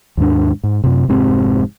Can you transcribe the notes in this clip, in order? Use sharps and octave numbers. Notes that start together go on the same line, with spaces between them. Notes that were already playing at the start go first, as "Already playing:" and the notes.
D#2 G#2 D4
G#2
F#2 C3
F1 G#2 C3 C4